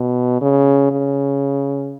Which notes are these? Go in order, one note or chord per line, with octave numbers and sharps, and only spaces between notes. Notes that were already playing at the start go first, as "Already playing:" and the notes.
Already playing: B2
C#3
C#3